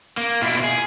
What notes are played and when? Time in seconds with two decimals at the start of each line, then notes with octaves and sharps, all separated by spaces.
0.17 A#3
0.42 B2 E4 F4
0.64 G#4